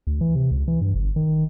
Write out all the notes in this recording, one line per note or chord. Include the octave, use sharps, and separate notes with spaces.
D2
E3
C3
C#2
E3
G2
G1
D#3